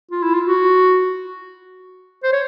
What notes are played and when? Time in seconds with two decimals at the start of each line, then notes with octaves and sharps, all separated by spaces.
0.11 F4
0.23 E4
0.34 F4
0.47 F#4
2.23 C5
2.33 C#5